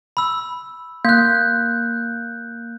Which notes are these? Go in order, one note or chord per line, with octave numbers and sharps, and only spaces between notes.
B5 E6
A#3 F#6 G6